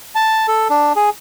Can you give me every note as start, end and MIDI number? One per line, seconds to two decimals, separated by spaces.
0.15 0.47 81
0.48 0.68 69
0.70 0.93 62
0.96 1.10 68